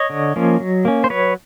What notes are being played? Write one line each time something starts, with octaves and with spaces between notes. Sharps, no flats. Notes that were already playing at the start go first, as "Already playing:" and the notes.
Already playing: C#5 D#5
D3
F3 A#3 C#4
F#3
A#3 C#4
C5
F#3 B4 C#5